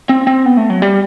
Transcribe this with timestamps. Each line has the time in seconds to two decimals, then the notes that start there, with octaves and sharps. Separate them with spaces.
0.09 C4
0.27 C4
0.46 B3
0.57 A3
0.70 F#3
0.82 G3